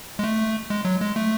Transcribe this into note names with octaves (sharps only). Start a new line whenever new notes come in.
G#3
A3
G#3
F#3
G#3
A3